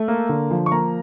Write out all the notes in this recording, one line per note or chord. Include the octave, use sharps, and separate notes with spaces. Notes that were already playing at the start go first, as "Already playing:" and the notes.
Already playing: A3
A#3
D3
F3
C#6
A#3 A#5